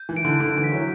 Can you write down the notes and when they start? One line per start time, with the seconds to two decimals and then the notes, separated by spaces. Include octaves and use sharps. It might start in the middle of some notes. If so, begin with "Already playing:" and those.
Already playing: G6
0.09 E3
0.17 D7
0.25 D3
0.40 D3 D7
0.57 E3
0.64 B6
0.72 F#3